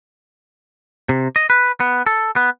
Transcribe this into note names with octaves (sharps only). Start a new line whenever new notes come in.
C3
D#5
B4
B3
A4
B3